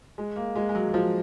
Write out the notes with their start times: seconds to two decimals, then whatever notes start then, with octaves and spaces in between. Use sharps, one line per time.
0.18 G#3
0.36 A#3
0.56 G#3
0.69 G#3
0.75 F#3
0.89 F#3
0.94 F3